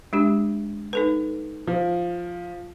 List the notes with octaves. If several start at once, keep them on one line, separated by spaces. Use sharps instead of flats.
G#3 D4 G4
D#4 A4 B4
F3